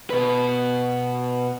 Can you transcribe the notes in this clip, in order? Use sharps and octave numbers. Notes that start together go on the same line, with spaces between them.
B2 B4